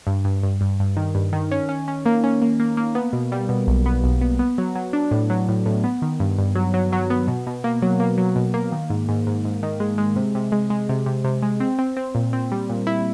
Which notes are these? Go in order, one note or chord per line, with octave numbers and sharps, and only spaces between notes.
G2
G2
G2
G2
G2
D#3
G2
D#3
C#4
C#4
C#4
A#3
C#4
A#3
A#3
A#3
B3
B2
G3
B2
B1
B3
B1
B3
B3
F#3
F#3
D4
A2
F#3
A2
A2
B3
D#3
G2
G2
F#3
F#3
F#3
B3
B2
B2
A#3
F#3
A#3
F#3
B2
A#3
D#3
G#2
G#2
G#2
G#2
D#3
G#3
G#3
C3
C3
G#3
G#3
C3
C3
C3
G#3
C4
C4
C4
A#2
C4
G3
A#2
E4